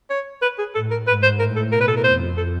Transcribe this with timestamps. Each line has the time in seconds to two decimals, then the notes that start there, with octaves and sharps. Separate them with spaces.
0.10 C#5
0.42 B4
0.59 G#4
0.75 A2 A4
0.91 A#4
1.07 G#2 B4
1.23 C5
1.39 A2 A#4
1.56 A4
1.72 B2 A#4
1.81 B4
1.88 A4
1.97 A#4
2.04 F2 C5
2.37 A4